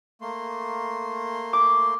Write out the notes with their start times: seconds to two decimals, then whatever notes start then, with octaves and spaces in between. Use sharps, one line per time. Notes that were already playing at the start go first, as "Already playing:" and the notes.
0.21 A3 A#3 C6
1.53 D6